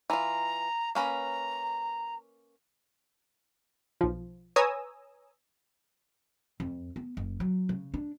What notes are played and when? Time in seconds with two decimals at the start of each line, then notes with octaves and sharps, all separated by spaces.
0.10 E3 F4 A#5
0.95 A#3 C#4 B4 A#5
4.01 B1 F3
4.56 B4 C#5 G#5 A#5 D#6 E6
6.60 F2
6.96 B3
7.17 F#1
7.40 F#3
7.69 C#3
7.94 D4